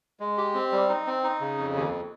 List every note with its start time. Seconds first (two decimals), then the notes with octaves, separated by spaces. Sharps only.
0.20 G#3
0.38 G4
0.54 C4
0.72 G3
0.89 D#4
1.07 C4
1.24 D#4
1.40 C#3
1.58 F2
1.75 D#2